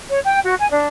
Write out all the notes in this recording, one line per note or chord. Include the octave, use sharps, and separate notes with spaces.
C#5
G5
F#4
G#5
D4